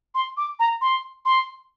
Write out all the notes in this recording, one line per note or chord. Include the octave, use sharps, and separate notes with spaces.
C6
D6
A#5
C6
C6